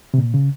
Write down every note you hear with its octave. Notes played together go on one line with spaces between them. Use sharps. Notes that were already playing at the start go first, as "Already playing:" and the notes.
C3
A#2
C#3